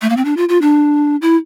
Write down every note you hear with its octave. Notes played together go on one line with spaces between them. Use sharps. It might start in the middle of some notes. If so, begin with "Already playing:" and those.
A3
A#3
C4
D4
F4
F4
D4
E4